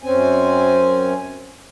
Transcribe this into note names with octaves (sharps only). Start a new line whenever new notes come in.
F#2 C4 C#4 G#5